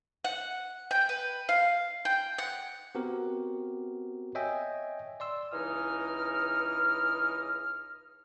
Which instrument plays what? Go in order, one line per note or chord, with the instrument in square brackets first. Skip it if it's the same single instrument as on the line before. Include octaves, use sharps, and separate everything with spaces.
[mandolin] F#5
G5
B4
F5
G5
F#5
[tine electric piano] B3 C4 F#4 G4 A#4
C#5 D#5 E5 G5 G#5
D5 C6 E6
[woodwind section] C#2 E3 D#4 D#6 F6